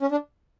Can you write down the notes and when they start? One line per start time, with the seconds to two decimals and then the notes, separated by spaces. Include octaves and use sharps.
0.01 C#4
0.11 D4